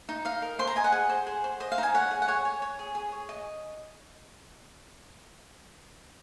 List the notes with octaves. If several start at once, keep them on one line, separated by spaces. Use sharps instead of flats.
D#4
D#5 F5
A#4
C5 C6
A#5
D#5 G#5
F#5
G#4
C5
G#4
C5
C5 D#5
F5
D#4 A#5
G#5
C#5 F#5
G#4
F#5
C#5 G#5
C#5
C#5
G#4
G#4
C#5
D#5